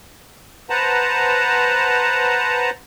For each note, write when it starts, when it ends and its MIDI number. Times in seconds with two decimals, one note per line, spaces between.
0.70 2.70 71
0.70 2.70 72
0.70 2.70 78
0.70 2.70 81
0.70 2.70 82